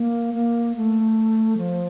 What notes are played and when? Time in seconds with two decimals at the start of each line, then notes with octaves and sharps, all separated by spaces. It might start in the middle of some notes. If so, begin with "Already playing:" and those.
Already playing: A#3
0.34 A#3
0.76 A3
1.58 F3